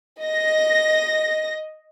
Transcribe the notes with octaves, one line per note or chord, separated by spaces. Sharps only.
D#5 A#6